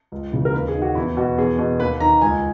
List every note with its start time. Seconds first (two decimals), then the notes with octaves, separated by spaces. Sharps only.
0.12 C#2
0.32 C#3 E3
0.45 A#4
0.53 D#2 B4
0.68 G#4
0.75 D#3
0.82 F#4
0.95 E2 E4
1.17 B2 F#4
1.37 E2 G#4
1.59 B2
1.79 D#2 B4
2.00 D#3 A#5
2.21 C#2 G#5